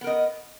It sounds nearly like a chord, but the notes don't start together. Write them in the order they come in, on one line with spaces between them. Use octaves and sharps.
B3 A#4 D#5